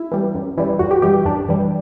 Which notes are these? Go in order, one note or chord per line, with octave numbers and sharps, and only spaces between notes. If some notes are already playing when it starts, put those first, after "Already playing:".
Already playing: E4
E3 G3
F#2
E3 G3
F#2 F#4
G4
E3 G3 G4
F#2 D4
E3 G3